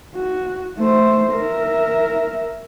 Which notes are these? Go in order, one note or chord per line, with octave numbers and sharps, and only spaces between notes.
F#4
A3 C5
A#4 E5